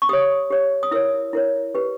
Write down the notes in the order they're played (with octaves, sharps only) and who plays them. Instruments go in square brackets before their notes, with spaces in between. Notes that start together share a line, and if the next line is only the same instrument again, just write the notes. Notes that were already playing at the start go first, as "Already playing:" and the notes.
[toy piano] C#6
G4 C#5 D#6
G4 C#5
D#6
E4 A#4 C#5 E6
E4 A#4 C#5
G4 B4